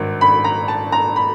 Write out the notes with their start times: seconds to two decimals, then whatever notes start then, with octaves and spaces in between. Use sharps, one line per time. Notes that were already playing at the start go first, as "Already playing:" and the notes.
Already playing: G#1 G2 D#3
0.21 B5
0.44 A#5
0.68 A5
0.92 A#5
1.16 B5